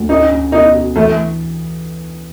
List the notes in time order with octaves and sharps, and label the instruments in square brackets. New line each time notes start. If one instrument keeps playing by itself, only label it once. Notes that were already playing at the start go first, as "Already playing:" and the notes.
Already playing: [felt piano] D2
[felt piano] C#4 [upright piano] D#4
[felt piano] C#4
[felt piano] B2 [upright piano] D#4
[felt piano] F#4
[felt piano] E3 [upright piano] A3